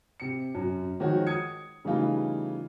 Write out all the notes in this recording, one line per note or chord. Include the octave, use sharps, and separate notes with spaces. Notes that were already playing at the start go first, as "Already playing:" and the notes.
C3 C#7
F#2
D#3 F3 G#3 F#4 C#5
D#6 G#6 C#7
C#3 E3 G3 A3 D#4 F4